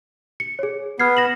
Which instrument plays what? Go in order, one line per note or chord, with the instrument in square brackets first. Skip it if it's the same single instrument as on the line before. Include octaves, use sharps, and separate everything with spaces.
[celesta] C#7
G#4 C#5
[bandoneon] B3 [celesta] F6 G#6 C7
[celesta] A#6 E7 F#7